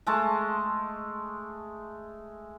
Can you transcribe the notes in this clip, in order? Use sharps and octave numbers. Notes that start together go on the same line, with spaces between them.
G#3 A3 A5